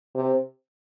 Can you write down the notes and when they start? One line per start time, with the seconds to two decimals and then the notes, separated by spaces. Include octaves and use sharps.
0.15 C3